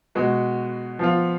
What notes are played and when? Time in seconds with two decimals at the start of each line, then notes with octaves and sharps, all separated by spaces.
0.15 B2 G#3 B3 F#4
0.99 F3 B3 F4